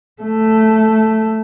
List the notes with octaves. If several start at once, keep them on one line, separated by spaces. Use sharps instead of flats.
A3